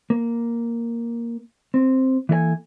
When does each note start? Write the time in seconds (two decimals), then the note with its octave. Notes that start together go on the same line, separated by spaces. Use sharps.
0.10 A#3
1.74 C4
2.29 E3 A#3 A4 D5 G#5